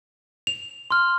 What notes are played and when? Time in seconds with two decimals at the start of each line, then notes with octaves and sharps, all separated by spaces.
0.47 F7
0.91 C6 F6